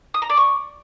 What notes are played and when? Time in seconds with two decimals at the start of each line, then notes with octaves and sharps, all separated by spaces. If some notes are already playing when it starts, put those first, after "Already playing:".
0.14 D#6
0.22 A#5
0.30 D5
0.37 C#6